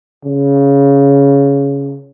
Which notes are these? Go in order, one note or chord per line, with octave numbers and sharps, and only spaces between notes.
C#3